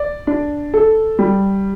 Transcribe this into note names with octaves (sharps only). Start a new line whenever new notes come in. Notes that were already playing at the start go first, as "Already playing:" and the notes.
Already playing: D5
D4
A4
G3